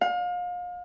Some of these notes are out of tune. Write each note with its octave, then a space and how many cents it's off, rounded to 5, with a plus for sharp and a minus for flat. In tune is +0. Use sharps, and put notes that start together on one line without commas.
F5 +35